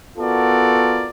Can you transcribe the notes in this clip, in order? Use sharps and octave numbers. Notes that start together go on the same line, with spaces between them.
B3 F4 F#4 A4 A#4 D5